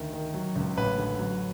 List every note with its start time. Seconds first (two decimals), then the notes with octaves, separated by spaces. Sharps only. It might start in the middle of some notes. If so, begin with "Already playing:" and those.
Already playing: D2 D#3
0.13 D#3
0.34 F#3
0.56 C#2
0.77 A1 B4
0.98 D3
1.19 F#3